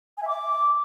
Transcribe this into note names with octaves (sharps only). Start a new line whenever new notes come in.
G#5
E5
D6